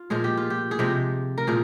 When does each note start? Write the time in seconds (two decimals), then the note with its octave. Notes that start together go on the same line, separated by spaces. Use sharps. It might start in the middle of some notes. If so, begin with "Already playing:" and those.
Already playing: F4
0.10 A#2 F3 G#3 G#4
0.24 G4
0.37 F4
0.50 G4
0.71 G#4
0.79 C3 F3 G#3 G4
1.38 A#4
1.47 A#2 F3 G#4